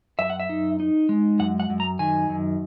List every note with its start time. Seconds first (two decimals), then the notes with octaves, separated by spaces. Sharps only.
0.19 F#2 E5
0.30 F#5
0.40 E5
0.49 D#4
0.80 D#4
1.09 G#3
1.39 F#2 F#5
1.60 F#5
1.70 F#2
1.80 A#5
1.99 D#3 G#5
2.29 F#2